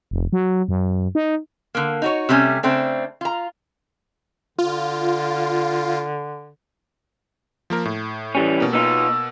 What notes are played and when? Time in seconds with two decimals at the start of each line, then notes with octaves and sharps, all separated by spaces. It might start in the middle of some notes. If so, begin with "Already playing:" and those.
0.11 F1
0.33 F#3
0.68 F#2
1.15 D#4
1.75 D3 A#3
2.02 D#4 F#4 C#5
2.29 C3 G3 A3 C#4
2.63 C#3 A3 C4 D4
3.21 F4 A#5
4.59 D3 F4
7.70 F3 A#3 A#4
7.85 A2
8.35 E3 G3 C#4
8.60 B2 A#3
8.73 B3 D#4 F4 E6